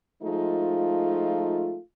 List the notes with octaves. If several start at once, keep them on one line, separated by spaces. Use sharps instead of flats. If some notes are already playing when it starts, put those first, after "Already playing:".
F3 G#3 A3 D#4 F4